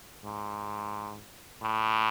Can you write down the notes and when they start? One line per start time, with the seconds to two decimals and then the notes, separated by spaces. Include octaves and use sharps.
0.24 G#2
1.63 A2